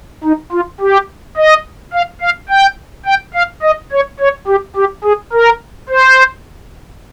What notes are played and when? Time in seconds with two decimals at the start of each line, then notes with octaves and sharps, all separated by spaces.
0.24 D#4
0.52 F4
0.81 G4
1.37 D#5
1.94 F5
2.21 F5
2.50 G5
3.06 G5
3.34 F5
3.63 D#5
3.92 C#5
4.20 C#5
4.48 G4
4.76 G4
5.04 G#4
5.33 A#4
5.89 C5